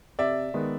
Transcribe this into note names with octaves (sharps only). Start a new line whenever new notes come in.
C3 D5 E5
D#3 G#3 B3